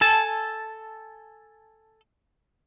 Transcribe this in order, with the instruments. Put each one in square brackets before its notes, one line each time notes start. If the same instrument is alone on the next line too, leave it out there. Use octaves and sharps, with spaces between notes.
[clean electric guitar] A4 G#5 A5